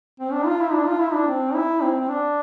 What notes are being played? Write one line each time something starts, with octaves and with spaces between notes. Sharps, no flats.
C4
D4
F4
E4
D4
F4
E4
D4
C4
E4
C4
C4
D4